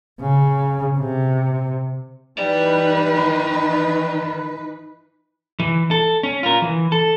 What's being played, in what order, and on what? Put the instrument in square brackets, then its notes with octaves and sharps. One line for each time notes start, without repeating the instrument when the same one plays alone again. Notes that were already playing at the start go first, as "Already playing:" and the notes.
[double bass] C#3
C3
[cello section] E3 D#4 B4 [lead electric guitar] G4 D5
[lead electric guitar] D#3
E3
A4
C#4
F4 A#4
E3
A4